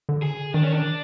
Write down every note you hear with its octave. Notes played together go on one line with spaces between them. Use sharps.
D3
G#4
D#3 D4
C#4
D4